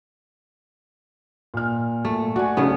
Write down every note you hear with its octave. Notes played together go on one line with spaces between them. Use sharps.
A#2 F6
A#2 A3
F#4 D5 G#5
B1 C#3 B3